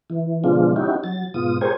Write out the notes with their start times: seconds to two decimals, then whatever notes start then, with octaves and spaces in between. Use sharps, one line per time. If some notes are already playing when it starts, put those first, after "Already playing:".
0.10 E3
0.44 B2 D3 F3 G#3 D4 F4
0.76 C#4 D#4 E4 F#4 G4
1.04 F#3 A6
1.34 G#2 B2 F4 D#6
1.61 G4 G#4 A#4 C5 C#5 G#5